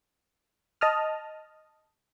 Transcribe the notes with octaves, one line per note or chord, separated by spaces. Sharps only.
D#5 A5 D#6 F6